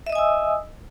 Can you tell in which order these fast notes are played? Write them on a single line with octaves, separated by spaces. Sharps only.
E5 D#5 D#6 G#5 E6